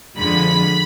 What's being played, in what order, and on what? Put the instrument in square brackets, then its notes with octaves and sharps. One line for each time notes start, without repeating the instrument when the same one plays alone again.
[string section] F2 D3 F3 G#3 B5